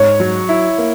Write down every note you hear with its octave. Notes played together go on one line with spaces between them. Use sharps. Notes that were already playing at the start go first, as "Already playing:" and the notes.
Already playing: G#2 C#5
F#3
E4
A#3